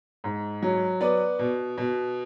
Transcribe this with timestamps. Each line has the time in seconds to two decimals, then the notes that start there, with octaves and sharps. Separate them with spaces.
0.24 G#2
0.62 F#3
1.01 B3 B4 D5
1.39 B2
1.77 B2